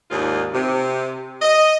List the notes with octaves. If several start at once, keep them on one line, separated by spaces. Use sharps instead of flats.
D#2 G#2 D4 F4 G#4
C3
D#5